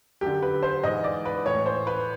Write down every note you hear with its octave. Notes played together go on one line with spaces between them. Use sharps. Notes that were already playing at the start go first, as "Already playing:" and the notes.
F#2 D3 G4
B4
C5
G#2 E3 D#5
D5
B4
A2 E3 C#5
C5
B4